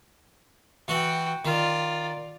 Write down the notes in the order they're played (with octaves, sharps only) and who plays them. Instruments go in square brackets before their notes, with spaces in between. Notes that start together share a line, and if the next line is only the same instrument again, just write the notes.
[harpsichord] E3 F#5 [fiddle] F#4 G5
[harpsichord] D#3 [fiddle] F4 D5